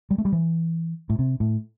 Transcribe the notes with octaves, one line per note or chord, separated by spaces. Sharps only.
G3
A3
G3
E3
A2
C3
A2